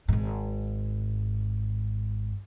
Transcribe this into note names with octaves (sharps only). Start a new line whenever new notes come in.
G#1 G#2